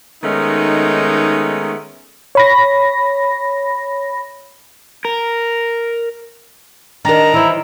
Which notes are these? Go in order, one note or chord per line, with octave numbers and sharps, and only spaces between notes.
D#3 G#3 A3 B3 C#4 D#4
C#5 B5 A#6
A#4
D#3 D4 A#4 A#5
E3 E4 C5